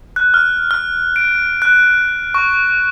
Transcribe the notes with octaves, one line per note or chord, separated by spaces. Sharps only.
F#6
F6
F6
D7
F#6
C#6